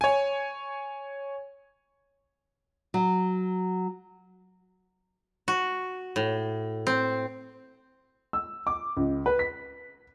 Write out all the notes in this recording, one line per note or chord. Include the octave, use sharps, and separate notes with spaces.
C#5 G#5
F#3
F#4
A2
C4
E6
D6
C#2
B4
B6